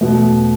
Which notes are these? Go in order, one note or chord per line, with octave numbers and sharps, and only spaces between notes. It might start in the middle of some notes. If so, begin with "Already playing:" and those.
E2 B2 A3